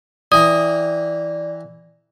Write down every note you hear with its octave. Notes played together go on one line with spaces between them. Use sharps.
E3 D5 G5 A#5 D#6